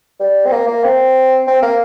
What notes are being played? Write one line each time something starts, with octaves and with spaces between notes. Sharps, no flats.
G3
C4
A#3
A#3
C4
C4
A#3